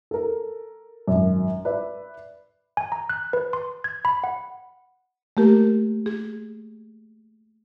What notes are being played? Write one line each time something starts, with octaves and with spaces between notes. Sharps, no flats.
A4 A#4
G#1 F#2
B4 D5 E5
G#5
A#5
F#6
B4
C6
G#6
B5
F#5
A3 A#3 G4 A#4
G#4